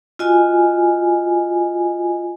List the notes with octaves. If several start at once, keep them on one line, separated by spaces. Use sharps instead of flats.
F4 F#4 D#5 G#5